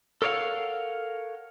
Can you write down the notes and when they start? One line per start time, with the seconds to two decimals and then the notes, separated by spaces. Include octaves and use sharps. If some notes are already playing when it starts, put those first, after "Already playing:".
0.22 A4 A#4 C#5 D5 F5 F#5